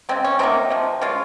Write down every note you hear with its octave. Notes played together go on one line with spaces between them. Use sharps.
C#3 G#3 C4
C#4
C3 F#3 A#3 C4 D#4
C3 F3 G#3
C#3 G#3 C#4 F4